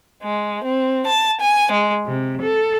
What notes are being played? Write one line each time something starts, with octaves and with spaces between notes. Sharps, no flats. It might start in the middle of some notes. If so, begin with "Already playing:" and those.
G#3
C4
A5
G#5
G#3
C3
A4